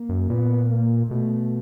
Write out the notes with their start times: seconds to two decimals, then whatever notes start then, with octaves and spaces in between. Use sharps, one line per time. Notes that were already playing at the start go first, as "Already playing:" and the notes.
Already playing: A#3
0.09 F#2
0.30 A#2 B3
0.70 A#3
1.11 B2 A3